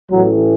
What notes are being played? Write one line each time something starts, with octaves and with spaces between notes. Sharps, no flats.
A1 A2 E3 F#3